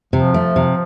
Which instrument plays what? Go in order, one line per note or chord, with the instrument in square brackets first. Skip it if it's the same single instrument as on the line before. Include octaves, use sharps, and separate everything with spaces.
[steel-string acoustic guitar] C3 [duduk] F3
[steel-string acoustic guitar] A3
C3